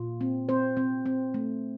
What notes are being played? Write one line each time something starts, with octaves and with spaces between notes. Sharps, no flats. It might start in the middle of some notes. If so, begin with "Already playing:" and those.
Already playing: A#2 F4
C4
C4 C5
C4
C4
A3